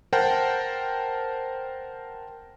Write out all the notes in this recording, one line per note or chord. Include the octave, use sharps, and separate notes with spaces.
A#4 C5 F#5 G5 A5